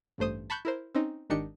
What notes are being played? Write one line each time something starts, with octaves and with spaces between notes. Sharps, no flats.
A1 G2 A3 C5 D#6
A5 B5 C#6 F#6 G6
E4 A#4 C5
C4 C#4 D#4
G#1 D#3 D4 D#4 G4 C#7